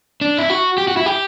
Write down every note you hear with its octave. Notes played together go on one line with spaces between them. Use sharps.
D4
E4
F#4
G4
F#4
E4
G4